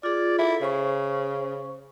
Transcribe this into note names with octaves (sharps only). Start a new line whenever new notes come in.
F4 G#4 D5
E4 A4
C#3 C5 C#6